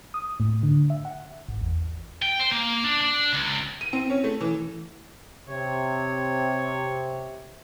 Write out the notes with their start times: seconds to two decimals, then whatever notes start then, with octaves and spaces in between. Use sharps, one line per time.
0.14 D#6
0.40 A2
0.63 D3
0.90 E5
1.05 F#5
1.49 G#1
1.61 E2
2.22 G5
2.40 C5
2.52 A#3
2.84 D4
3.01 D4
3.33 C#2
3.81 D#7
3.93 C4
4.10 C#4
4.24 A3
4.41 E3
5.48 C3 C#5